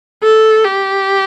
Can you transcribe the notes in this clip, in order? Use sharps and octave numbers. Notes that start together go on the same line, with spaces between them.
A4
G4